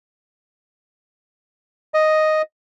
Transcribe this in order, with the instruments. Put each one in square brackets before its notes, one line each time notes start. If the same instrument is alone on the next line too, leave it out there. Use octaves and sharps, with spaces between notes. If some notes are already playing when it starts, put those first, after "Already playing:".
[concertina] D#5